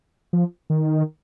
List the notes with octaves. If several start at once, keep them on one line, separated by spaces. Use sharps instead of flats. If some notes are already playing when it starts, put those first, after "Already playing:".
F3
D#3